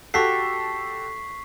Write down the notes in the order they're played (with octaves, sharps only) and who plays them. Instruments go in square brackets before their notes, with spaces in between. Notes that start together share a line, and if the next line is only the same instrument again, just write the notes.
[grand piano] F#4 G4 A4 [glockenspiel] C#6 B6 C7